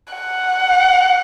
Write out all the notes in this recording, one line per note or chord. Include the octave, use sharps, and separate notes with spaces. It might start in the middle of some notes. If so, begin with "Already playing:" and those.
F#5